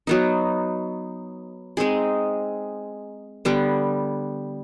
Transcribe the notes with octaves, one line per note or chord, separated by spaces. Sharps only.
F#3 B3 D#4
G#3 C4 D#4 G#4
D3 G3 B3